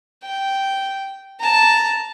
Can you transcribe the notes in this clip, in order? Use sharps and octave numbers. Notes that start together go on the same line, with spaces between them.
G5
A5 A#5